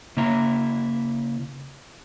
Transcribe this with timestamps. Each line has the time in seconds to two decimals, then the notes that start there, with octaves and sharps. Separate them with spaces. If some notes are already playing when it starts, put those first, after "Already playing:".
0.17 C#3 A#3 E4 A#5